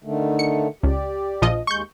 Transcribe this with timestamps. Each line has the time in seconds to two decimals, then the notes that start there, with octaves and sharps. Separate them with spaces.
0.04 D3 D#3 A3
0.39 C#7
0.83 C#2 G4 D5
1.42 A#1 F3 D#5
1.67 D#2 G#3 C#6 G6